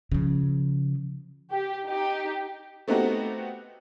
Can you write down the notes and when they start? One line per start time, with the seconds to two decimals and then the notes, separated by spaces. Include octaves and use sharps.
0.12 C#3 F3
1.51 G4
1.86 D#4 G4
2.88 A3 B3 C4 D#4 F#4 G4